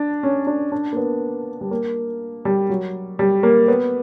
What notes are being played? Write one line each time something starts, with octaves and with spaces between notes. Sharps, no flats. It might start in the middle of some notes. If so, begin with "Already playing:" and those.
Already playing: D4
C#4
D4
D4
A#3
B3
G3
A#3
G3
F#3
G3
A#3
B3